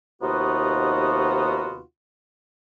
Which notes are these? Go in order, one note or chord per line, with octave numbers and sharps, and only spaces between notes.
D#2 C3 B3 D#4 F4 F#4